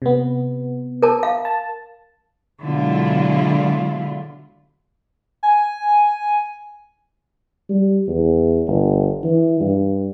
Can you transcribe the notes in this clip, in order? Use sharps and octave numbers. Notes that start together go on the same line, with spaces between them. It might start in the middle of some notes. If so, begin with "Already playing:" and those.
C3 B3
A#4 A5
F5
A5
B2 D3 F#3 G#3 E4 F4
G#5
G3
E2
G1
E3
G2